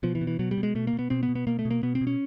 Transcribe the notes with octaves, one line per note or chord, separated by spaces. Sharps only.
B2 F3
E3
B2
E3
B2 F#3
G3
B2
G#3
B2 A3
A#3
B2
B3
B2 C4
B3
B2
B3
B2 A#3
A3
B2
A#3
B2 B3
C4
B2
C#4